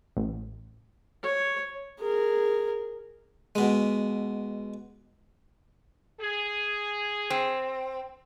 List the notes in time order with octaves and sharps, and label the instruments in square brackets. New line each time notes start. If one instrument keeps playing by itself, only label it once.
[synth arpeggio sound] A1
[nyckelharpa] C#5
G#4 A#4
[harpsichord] B2 G#3
[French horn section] G#4
[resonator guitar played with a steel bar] C4